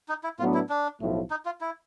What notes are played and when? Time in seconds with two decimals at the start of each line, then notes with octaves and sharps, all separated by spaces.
0.09 D#4
0.24 E4
0.39 A2 F#3 B3 D4 F4
0.54 E4
0.69 D4
1.00 B1 A2 F3 A3
1.30 D#4
1.46 F4
1.61 E4